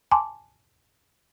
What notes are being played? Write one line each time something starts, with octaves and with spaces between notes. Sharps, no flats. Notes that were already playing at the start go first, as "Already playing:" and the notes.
G#5 A5 C6 D6